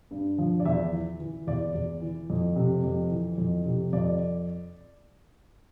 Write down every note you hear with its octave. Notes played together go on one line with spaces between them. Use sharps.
G2
F3
D5
E2 E5
E3
E3
E2 D5
E2
E3
F2
C3
F2
E3
F2
C3
F2 D5